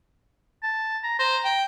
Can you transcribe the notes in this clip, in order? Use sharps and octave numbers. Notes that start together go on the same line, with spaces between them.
A5
A#5
C5 A#5
G5